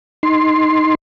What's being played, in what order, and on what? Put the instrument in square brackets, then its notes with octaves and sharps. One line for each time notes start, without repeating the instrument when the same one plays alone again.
[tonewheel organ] D#4 C6